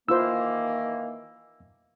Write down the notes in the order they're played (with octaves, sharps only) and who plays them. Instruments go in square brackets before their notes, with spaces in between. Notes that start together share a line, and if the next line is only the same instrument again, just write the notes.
[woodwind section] D#3 E3 A#3 [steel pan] E4 F4 C5 [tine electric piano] E6